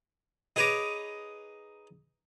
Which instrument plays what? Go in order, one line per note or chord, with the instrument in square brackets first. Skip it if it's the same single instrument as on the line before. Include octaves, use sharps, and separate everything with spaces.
[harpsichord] D#4 G#4 B4 C#5 A#5 D6